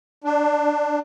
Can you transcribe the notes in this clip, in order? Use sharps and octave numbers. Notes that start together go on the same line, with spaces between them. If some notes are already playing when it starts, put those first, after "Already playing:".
D4